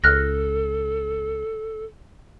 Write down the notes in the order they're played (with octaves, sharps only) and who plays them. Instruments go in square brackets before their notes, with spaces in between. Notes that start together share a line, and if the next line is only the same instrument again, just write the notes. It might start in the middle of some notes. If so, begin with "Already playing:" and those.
[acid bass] C#2 [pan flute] A4 [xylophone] F6 F#6 A#6